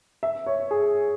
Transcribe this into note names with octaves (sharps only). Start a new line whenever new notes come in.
E5
C#5
G#4